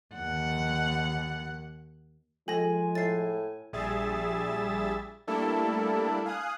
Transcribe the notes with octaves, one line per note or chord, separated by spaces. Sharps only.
D#2 F#5
F3 G#3 A4 G#5 A#6
A2 A6 C7
A#1 G3 G#4 E5 A6
G3 A3 A#3 D4 E4 A4
F5 G#5 D#6 F#6